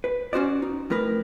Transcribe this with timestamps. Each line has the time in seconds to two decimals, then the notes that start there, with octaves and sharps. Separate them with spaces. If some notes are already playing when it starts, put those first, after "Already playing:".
0.04 B4
0.33 C#4 F#4 C5 D5
0.62 D#4
0.90 F2 A2 A#4 B4